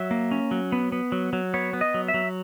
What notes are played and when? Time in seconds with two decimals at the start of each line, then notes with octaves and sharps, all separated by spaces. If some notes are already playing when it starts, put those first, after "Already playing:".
Already playing: F#3 E5
0.11 A#3
0.31 C#4
0.51 F#3
0.72 B3
0.92 B3
1.12 F#3
1.33 F#3
1.54 B3 C#5
1.73 B3
1.81 D#5
1.94 F#3
2.08 E5
2.14 F#3